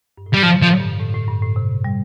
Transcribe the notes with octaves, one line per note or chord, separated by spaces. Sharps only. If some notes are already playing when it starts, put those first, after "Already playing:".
G2
A2
C3 G3
D3 F3
A2 F3
G2
A2
A2
G2
A2
C3
G3